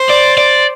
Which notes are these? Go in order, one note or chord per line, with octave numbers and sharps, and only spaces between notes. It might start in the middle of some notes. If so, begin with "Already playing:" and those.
Already playing: C5
D5
D5